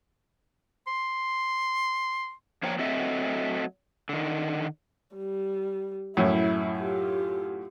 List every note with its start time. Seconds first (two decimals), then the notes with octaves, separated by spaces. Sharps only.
0.87 C6
2.63 F3 A#3 D4 C#5 G5 A#5
2.79 F#3 A3 C4 A4 D#5 E5
4.09 D3 D#3
5.16 G3
6.17 F#2 A2 E4
6.76 F4 G4